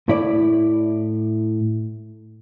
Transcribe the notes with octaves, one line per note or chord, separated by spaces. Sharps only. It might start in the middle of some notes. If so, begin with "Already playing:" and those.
A2 E4 D5